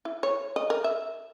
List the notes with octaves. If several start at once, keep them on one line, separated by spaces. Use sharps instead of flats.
E4
C#5
D#5
A#4
E5